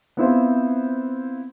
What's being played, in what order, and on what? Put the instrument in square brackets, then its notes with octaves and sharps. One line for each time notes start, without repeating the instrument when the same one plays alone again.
[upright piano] B3 C4 E4 F4 C5